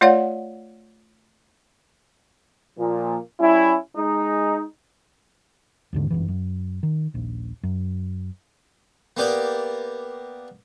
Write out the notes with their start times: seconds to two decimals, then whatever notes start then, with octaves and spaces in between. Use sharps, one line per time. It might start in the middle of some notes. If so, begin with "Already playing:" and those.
0.01 A3 F4 C#5 D5 F5 F#5
2.78 A#2 F3
3.40 G3 C#4 E4
3.96 G#3 D#4
5.93 D#2 G#2 D3
6.10 G1 F#2 E3
6.28 F#2
6.83 D#3
7.14 D#1 A#1
7.63 F#2
9.17 A#3 B3 G4 D5